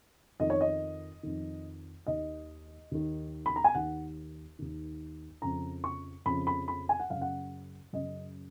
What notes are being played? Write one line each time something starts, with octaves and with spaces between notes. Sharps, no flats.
F2 D#3 D#5
C#5
D#5
F2 D#3
D#2 D#3 D#5
D#2 D#3
B5
A#5
G#5
D#2 D#3 F#5
D#2 D#3
F2 C#3 A#5
C#6
F2 C#3 B5
B5
B5
G#5
F#5
F#2 C#3 F5
F#5
F#2 C#3 D#5